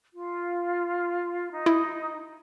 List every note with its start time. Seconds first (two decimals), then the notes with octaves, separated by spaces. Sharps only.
0.14 F4
1.51 D#4
1.66 E4